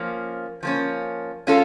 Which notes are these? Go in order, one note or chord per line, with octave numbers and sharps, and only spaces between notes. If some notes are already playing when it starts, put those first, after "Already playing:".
Already playing: F3 A#3 C#4
F3 A#3 C#4
G#3 C#4 F4 A4